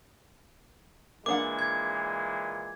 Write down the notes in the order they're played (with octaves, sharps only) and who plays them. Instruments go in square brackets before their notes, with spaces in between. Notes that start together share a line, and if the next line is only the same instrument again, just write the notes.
[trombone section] A#2 E3 G#3 [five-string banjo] A#3 D4 F#5 [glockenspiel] D6
[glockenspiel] G#6